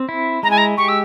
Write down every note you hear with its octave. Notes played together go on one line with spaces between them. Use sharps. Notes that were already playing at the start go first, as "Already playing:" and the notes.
Already playing: C4
E4
G#3 A#5
G#5
A#5
G4 C#6
E6